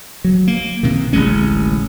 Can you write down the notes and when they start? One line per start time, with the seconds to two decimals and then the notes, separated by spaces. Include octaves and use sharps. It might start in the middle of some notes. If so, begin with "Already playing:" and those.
0.24 F#3
0.48 A#3
0.83 C3 D#3
1.13 D1 A1 G#3 C#4